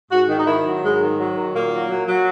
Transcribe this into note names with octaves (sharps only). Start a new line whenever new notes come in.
G#2 F#4
D#3
D#4
D#3 E4
F#3
G#2 G#3
D#3
F#3
D#3
A#2 A#3
F#3
F#3
F#3